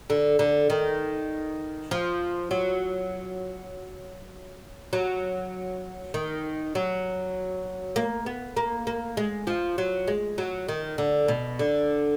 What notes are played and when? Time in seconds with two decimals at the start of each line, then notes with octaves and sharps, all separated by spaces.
0.10 D3
0.39 D3
0.70 D#3
1.91 F3
2.51 F#3
4.93 F#3
6.14 D#3
6.75 F#3
7.96 A#3
8.26 B3
8.57 A#3
8.87 A#3
9.17 G#3
9.47 F3
9.78 F#3
10.08 G#3
10.38 F#3
10.69 D#3
10.98 D3
11.28 B2
11.59 D3